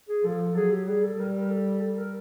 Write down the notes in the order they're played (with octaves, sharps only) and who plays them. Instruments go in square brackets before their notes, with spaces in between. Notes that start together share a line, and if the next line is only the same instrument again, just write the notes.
[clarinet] G#4
[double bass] F3 [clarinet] A4
[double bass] F#3 [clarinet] G#4
[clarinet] G4
[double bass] G3 [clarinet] G#4
[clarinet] A4
[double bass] G3 [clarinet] A#4
[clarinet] A#4
A4
A4
A#4